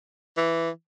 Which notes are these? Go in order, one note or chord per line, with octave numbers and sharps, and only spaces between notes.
E3